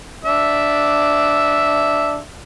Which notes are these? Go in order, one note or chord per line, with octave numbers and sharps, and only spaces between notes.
D4 E5